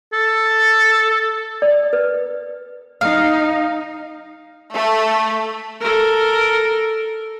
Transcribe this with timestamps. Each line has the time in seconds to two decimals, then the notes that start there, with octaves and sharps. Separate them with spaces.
0.13 A4
1.62 D5
1.93 B4
3.01 D#4 F5
4.73 A3
5.80 A4 A#4